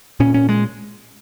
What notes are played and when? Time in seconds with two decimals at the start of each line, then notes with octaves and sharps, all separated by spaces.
0.20 A#2 C#4
0.34 C#4
0.49 G#3